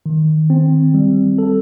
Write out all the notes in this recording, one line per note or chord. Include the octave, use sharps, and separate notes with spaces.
D#3
C4
G3
A4